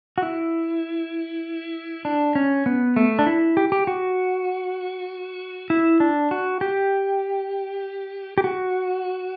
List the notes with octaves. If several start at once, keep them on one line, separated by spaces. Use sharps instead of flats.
F#4
E4
D4
C#4
B3
A3
D4
E4
G4
G4
F#4
E4
D4
F#4
G4
G4
F#4